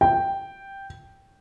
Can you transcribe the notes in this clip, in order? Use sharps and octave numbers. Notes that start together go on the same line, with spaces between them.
G5